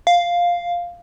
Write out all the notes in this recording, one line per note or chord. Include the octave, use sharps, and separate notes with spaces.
F5